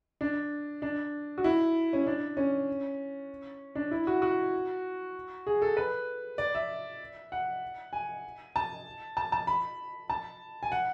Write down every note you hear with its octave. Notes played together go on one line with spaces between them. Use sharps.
D4
D4
F#4
E4
C#4
D4
C#4
D4
E4
F#4
F#4
G#4
A4
B4
D5
E5
F#5
G#5
A5
A5
A5
B5
A5
G#5
F#5